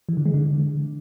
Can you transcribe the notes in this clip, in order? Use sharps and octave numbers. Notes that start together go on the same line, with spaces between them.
E3
D3
G#3
D3